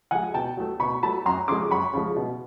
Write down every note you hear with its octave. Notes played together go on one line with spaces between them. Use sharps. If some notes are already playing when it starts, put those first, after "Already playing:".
F3 G#3 F#5 G#5
B2 G5 A5
F#3 A3
B2 B5 C#6
F#3 A3 A5 B5
F#2 A#5 C6
C#3 F3 G#3 C6 D6
F#2 B5 C#6
C#3 F3 G#3
B2